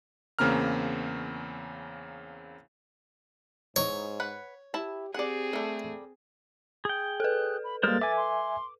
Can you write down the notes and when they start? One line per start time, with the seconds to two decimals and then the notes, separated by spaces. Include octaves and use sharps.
0.39 E2 C#3 A#3 C4 A#5 F6
3.76 G#2 E3 D#4 C#5
4.20 B4 F#5
4.74 E4 G4 A5
5.14 C4 G4 G#4 D5 F#5
5.53 G3 A3 A4
6.85 G#4 G5
7.20 A4 B4 F#6
7.64 B5
7.83 G3 G#3 A#3 A#4 C5 A6
8.01 E5 G#5 D6
8.17 C6